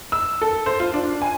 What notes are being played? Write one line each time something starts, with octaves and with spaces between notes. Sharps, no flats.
E6
A4
C5
F4
D4
G#5